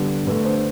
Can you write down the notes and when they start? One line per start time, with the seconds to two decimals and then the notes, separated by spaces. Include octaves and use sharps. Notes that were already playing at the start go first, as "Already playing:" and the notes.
Already playing: D3 G3 B3
0.27 D3 A3 B4
0.45 C5